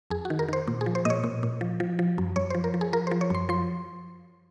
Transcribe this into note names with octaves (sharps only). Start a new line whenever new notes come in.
F2 G#4
F#4
D#3
A#4
D#3 C5
A#2
G#4
F3
C5
A#2 C#5 D#5
A#2
A#2
F3
F3
F3
F#2
F#2 C#5
C5
F3
A#4
F3
G#4
F3 A#4
C5
F3
C#5
F#2 C6
F3 C6